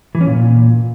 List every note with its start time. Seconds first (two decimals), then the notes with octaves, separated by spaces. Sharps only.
0.15 E3
0.21 C#4
0.27 A#2